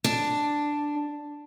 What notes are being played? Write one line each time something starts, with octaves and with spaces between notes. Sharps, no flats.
D4